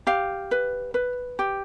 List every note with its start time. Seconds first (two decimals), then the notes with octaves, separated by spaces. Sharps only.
0.07 G4 F5
0.51 B4
0.94 B4
1.39 G4